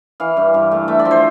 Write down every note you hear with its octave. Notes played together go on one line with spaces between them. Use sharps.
E3 F5
G2
G2
A3
A3 E5
D5
F3
C5